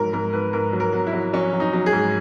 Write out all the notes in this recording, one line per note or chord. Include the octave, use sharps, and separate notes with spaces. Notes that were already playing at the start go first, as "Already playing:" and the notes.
Already playing: G#2 F#3 A#4
G#2 A#4
G#2 B4
G#2 A#4
F#3
A#4
F#3
E4
F#3
F#3 C#4
F#3
D#4
F#3
G#4
G#2